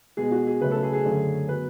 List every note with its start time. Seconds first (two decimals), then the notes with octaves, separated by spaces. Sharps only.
0.17 B2 G#3 B3 G#4
0.31 F#4
0.47 G#4
0.61 C#3 F#3 A3 C#4 B4
0.71 A4
0.83 G#4
0.93 G#4
1.05 F#2 D3 A3 C#4
1.48 F#3 B3 B4